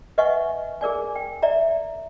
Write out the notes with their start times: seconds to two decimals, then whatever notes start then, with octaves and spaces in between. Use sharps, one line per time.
0.18 B4 D#5 E5 F#5 G#5 C#6
0.81 G#4 A#4 D5 G#5
1.16 G5
1.42 D5 E5 A#5